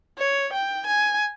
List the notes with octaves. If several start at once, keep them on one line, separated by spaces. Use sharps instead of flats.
C#5
G5
G#5